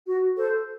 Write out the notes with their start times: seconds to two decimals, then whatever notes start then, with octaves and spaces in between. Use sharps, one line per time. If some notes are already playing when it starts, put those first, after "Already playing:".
0.07 F#4
0.36 A4 C5